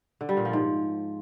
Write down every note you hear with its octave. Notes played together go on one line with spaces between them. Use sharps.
D3
G3
A#2
F3
G#2